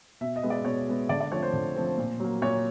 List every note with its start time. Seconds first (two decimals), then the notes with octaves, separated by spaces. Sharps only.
0.21 B2 E5
0.36 D#5
0.43 G#3 B3
0.50 D5
0.65 B2 C#5
0.87 G#3 B3
1.09 D3 D5
1.20 D5
1.32 F3 A3 C4 C#5
1.43 C5
1.53 D3
1.76 F3 A3 C4
1.98 A#2
2.20 F#3 A#3
2.42 A#2 C#5